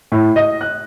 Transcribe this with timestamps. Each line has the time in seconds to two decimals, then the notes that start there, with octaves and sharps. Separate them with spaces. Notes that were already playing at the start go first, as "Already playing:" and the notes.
0.12 A2
0.36 D#5
0.61 F#6